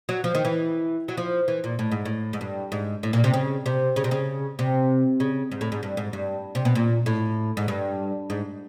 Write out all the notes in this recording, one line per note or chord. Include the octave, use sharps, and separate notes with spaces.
F#3
F3
D#3
E3
F#3
F3
E3
A#2
A2
G#2
A2
G#2
G2
G#2
A2
A#2
C3
C#3
C3
C#3
C3
C#3
C3
C#3
G#2
A2
G#2
G2
G#2
G2
C3
B2
A#2
A2
G#2
G2
G#2